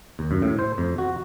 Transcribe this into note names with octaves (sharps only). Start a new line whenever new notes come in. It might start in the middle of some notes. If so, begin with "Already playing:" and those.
D#2
F#2
A2
C5
F2
F#4